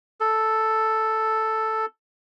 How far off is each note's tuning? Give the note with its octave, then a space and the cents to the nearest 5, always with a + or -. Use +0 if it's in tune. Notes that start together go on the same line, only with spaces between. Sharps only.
A4 +0